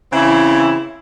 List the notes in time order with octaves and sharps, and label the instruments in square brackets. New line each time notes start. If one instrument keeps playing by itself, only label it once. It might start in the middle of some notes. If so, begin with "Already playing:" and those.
[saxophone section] C#3 E3 C4 E4